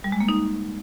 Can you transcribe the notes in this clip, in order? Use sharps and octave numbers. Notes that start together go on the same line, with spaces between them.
G3
G#3
A#3
D#4